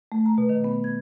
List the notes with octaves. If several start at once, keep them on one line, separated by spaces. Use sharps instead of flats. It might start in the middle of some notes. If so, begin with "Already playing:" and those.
A3
A#5
B2
D#3
B3
G#6